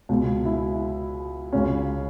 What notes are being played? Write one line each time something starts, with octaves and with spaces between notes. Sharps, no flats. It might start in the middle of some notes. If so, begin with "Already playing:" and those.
C#2 B2 G#3
E4
C#2 C#3 G#3 C#4